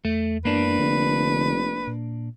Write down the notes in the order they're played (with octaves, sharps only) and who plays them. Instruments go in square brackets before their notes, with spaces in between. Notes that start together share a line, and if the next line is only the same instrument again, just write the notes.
[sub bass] E2 [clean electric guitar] A3
[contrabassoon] E1 [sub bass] F#2 [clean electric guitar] A#3 D4 [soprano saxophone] B4
[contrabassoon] F1 [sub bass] D3
[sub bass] A#2